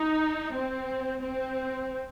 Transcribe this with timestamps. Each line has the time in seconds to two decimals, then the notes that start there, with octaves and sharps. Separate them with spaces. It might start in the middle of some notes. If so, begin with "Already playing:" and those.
Already playing: D#4
0.53 C4
1.22 C4